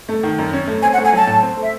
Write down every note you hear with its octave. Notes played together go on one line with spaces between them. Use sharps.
A3
D#3
F#2
C#4
A3
C4 G#5
F#5
A3
G#5
F#3 A5
A2
C4
A3
E5